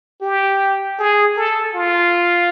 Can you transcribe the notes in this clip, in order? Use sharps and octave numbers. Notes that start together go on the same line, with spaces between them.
G4
G#4
A4
F4